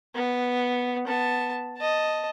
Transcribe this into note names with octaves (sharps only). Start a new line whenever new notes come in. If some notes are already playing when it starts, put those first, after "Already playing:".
B3
B3 A5
D#5 A5